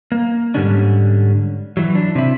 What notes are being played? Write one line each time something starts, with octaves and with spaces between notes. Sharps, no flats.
A#3
G#2 B2 D3 G3 C#4 D4
E3 F#3
D4
C3 E4